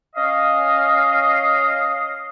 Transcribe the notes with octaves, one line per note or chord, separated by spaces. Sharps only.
C#4 D#5 F5